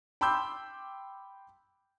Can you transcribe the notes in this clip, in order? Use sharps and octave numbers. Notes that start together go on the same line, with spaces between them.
G5 B5 C6 D6 E6 G6